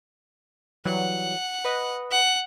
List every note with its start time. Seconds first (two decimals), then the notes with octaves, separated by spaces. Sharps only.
0.85 E3 F#3 G3 F#5
1.65 B4 D#5
2.11 F#5